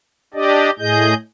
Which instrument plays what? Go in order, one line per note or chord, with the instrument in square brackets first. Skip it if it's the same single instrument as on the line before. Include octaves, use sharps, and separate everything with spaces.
[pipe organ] D4 G4 D5 D#5
A2 G#4 D#5 G6